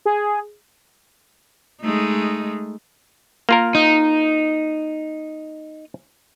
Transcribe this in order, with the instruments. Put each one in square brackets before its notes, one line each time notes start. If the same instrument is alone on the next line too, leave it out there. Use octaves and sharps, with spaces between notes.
[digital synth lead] G#4
[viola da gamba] G#3 A3 D#4
[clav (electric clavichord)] A#3 F4 A#4
[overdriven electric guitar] D#4